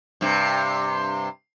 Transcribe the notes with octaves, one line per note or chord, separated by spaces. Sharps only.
G2 C3